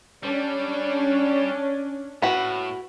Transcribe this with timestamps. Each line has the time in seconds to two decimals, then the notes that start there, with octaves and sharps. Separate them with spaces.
0.23 G3 C#4 D4
2.22 A2 F#4 B4